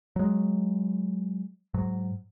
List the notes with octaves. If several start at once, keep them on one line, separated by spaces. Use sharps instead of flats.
F#3 G#3
G#2 F#3